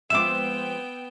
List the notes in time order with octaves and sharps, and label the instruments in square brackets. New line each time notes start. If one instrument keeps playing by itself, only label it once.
[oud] F3 G#3 C4 [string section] B3 G5 [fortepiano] E5 D6 [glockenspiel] E7